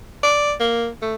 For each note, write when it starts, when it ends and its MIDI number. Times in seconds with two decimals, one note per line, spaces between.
0.23 0.54 74
0.60 0.89 58
1.02 1.15 57